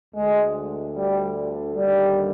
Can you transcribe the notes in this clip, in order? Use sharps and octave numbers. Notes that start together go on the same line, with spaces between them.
D2 D3 G#3
G3
D#2 D3 G3